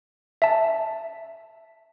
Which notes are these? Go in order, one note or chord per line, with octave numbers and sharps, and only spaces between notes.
E5 A5